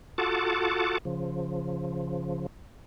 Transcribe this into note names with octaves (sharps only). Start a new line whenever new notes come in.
F4 F#4 A4 F#5 A5 D6
C#3 F3